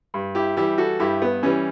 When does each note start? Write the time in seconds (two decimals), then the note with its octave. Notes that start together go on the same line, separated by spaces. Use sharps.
0.14 G2
0.35 E4 G4
0.56 E3 G3 E4 G4
0.78 F#4 A4
1.00 G2 E4 G4
1.22 B3
1.43 E3 G3 C#4